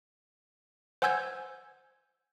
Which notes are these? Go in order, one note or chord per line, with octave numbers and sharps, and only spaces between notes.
C5 F#5 G#5 E6 G6 G#6